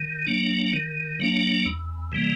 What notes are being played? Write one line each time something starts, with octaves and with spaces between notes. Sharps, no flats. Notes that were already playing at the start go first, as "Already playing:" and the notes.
Already playing: D#3
F#3 A#3 D4
D#3
F#3 A#3 D4
E2
C3 E3 G3 A#3